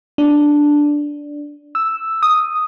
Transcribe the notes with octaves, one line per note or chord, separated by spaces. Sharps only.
D4
E6
D#6